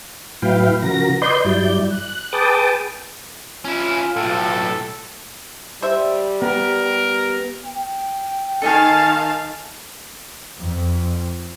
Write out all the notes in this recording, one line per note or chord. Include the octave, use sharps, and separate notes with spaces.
A2 F#3 E4 B4 F5 G5
C#3 F3 F#4 A#4 A#6
B4 D5 D#5 C6 G6
G2 F#3 G3 E4 D5 G6
F#6
G#4 B4 G5 A5 D6 D#6
C#4 E4 F4
B1 A2 A4
G3 C5 E5
B3 G4 A#4
G5
D#3 A4 D#5 F5 G#5 A5
F2